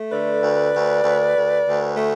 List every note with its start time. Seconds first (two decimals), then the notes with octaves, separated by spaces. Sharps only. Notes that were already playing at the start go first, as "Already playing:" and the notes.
Already playing: A3
0.11 D3 B4 D5
0.43 D2
0.74 D2
1.04 D2
1.35 D2
1.66 D2
1.96 A3